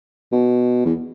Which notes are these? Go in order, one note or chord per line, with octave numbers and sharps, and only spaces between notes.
B2
E2